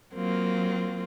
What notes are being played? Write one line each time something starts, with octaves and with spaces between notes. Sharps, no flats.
F#3 A#3 C4 F4